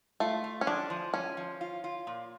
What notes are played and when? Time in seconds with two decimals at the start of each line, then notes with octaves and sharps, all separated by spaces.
0.20 A3 F4
0.44 F4
0.61 C#4
0.67 F3 D4
0.90 F3
1.14 F3 C#4
1.37 F3
1.61 F4
1.84 F4
2.07 A#2